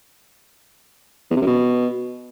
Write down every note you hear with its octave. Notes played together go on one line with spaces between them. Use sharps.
E2
C3
F#2
B2